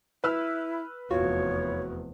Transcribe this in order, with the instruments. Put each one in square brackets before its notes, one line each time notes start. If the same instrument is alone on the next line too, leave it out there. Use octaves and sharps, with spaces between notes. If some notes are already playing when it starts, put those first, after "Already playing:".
[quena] E4 [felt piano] B4 E6 F6
[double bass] F1 E2 [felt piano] F4 [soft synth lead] F#4 [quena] C#5